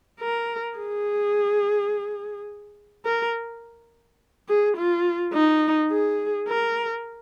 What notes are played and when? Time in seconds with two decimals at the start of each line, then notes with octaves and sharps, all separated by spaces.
0.20 A#4
0.77 G#4
3.06 A#4
4.48 G#4
4.77 F4
5.34 D#4
5.91 G#4
6.48 A#4